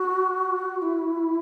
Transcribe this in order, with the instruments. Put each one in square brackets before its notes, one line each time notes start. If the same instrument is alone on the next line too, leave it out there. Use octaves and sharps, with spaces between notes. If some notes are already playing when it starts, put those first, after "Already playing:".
Already playing: [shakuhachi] F#4
E4